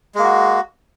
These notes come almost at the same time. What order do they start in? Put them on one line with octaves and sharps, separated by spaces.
G#3 A#3 F#4